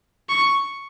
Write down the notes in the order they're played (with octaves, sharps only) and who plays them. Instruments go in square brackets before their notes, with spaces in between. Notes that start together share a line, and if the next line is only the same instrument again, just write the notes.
[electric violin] C#6